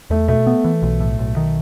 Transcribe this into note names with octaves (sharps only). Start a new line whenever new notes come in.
E2 A3
B2 A3
B3
E3
B1
A2
B1
D#3